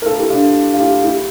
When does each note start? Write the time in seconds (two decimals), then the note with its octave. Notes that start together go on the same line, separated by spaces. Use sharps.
0.02 A#4
0.06 F4 A4
0.18 E4 G4
0.30 D4 F4
0.74 F4
0.79 E4 G4
1.04 E4 G4